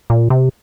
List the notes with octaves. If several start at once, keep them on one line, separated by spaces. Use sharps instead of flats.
A#2
C3